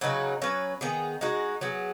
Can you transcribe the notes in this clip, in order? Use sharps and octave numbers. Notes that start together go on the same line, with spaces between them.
C#3 F#3 D#4 B4
F#3 C#4 B4
D#3 B3 G#4
G#3 D#4 F#4
F#3 B3 G#4